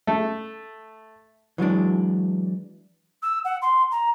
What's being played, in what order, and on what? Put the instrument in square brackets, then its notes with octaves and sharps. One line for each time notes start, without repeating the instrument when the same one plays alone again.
[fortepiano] A3
[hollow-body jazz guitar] E3 F#3 G#3 D4
[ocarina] E6
F#5
C6
A#5